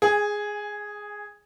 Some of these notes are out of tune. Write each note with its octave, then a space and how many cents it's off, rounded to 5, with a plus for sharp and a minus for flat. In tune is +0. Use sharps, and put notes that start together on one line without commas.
G#4 +0 G#5 -25